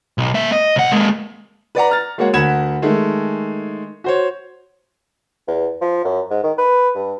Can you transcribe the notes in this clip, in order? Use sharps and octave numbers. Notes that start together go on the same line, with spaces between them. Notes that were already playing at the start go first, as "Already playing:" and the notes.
B1
A#3 E5
D#5
C2 F#5
G#3 A#3
B4 D5 F#5 A#5
A#5 F6 A6
G#3 A#3 F#4 C#5 F#5
D2 A#4 F#5 B5 G#6 E7
D#3 G#3 A3
F#4 C5 C#5
E2
F3
F#2
G#2
D#3
B4
G2